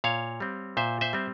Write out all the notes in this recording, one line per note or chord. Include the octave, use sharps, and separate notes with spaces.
A#2 C#5 F5
G3 C4
A#2 C5 E5
C5 E5
G3 C4